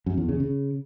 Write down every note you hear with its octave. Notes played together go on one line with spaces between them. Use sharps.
F#2
E2
C#3
C#3